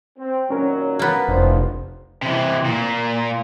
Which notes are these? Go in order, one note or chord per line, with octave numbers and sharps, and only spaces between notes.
C4
A#2 D#3 F#3 C#4 A#4
A#3 B3
F1 A2 E3 F3 D4 C5
C3 E3
A#2